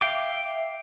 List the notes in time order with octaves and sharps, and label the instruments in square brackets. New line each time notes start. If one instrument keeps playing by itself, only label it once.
[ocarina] E5 [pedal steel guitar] F5 G5 D6